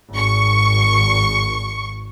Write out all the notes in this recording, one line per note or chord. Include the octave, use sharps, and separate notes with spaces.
G#1 C#6